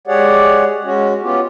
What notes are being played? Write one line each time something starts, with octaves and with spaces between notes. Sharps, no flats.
G#3 G4 G#4 C#5 D5 F#5
G#3 C#4 F#4
B3 C#4 F4 G4